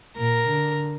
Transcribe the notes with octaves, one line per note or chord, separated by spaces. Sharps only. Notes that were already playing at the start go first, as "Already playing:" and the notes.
A#2 A#4
D3